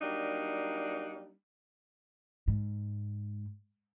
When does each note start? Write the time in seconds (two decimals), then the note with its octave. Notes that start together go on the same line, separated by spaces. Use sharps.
0.02 F#3 G3 A#3 D4 D#4
2.48 G#2